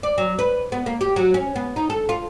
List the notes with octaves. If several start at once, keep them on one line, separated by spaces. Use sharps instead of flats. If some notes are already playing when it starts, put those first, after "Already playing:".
D5
F#3
B4
B3
A#3
G4
F#3
C#4
B3
D#4
A4
F4